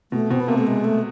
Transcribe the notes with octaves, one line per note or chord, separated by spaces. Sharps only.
B2 A3
B2 C4
B3
C3 A#3
A3
G#3
A3